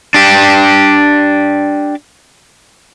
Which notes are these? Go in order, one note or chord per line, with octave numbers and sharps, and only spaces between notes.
D4 G4